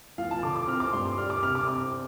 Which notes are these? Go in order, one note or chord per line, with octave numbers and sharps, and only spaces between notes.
F3 F5
A5
D3 D6
D6
C4 F6
D6
G2 C6
D6
G3 F6
D6
C3 F6
D6
C4 D6